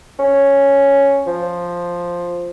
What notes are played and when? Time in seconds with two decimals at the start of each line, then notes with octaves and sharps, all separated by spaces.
0.19 C#4
1.27 F3